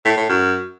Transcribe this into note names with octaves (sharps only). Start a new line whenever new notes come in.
A2
A2
F#2